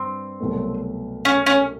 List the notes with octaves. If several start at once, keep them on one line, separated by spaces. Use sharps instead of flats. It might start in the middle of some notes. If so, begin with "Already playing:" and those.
Already playing: G2 C4
C2 B2 F#3 A3
C#4
C#4